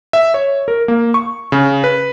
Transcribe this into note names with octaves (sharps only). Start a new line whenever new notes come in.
E5
C#5
A#4
A#3
C#6
C#3
B4